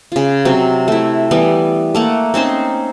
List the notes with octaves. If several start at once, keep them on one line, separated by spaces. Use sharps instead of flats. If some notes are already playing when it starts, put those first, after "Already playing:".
C#3 F4
C3 F#3 C4
A3 E4
E3 G3 B3
A3 A#3 F#5
C4 C#4 D#4 C5